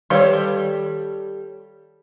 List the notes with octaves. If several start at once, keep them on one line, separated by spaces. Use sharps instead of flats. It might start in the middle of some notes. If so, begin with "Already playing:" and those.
D#3 G3 A4 B4 C#5 F5